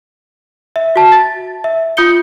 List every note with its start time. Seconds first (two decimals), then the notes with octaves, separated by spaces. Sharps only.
0.76 E5
0.96 F#4 A5
1.12 A6
1.64 E5
1.97 F4 D#6 G6 C#7 G7